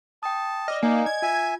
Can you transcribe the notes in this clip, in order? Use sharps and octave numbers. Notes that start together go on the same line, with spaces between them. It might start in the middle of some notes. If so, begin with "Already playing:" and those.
G5 A5 D#6
D5 D#5 D6 F6
A#3 D#4 D#5 G#5
G#6
F4 E5 G#5